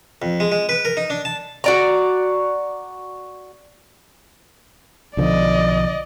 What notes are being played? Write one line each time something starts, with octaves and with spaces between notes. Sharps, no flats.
F2
G#3
G#3
B4
A#4
D#4
D4
A5
F#4 D5 A#5
B1 D3 F3 D5 D#5